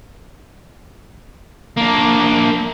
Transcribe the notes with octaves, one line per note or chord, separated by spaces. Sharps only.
A#3 D4